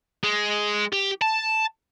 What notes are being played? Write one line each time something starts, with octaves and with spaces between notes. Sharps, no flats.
G#3
G4
A5